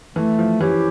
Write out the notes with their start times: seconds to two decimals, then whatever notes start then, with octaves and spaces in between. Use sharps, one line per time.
0.16 E3 A3
0.39 F3
0.61 E3 C#4 E4 G4